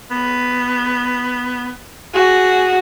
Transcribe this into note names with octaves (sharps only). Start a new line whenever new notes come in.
B3
F#4 G#4